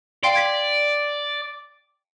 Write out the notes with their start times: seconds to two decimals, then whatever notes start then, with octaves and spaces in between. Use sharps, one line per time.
0.24 D5 F5 G5 C6
0.35 G#6 B6